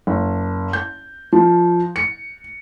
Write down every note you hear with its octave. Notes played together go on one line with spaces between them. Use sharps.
F#1
G6
F3
C#7